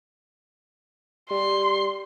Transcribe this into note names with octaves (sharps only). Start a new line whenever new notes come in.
G3 C6